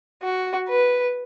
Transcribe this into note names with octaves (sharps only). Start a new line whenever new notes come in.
F#4
B4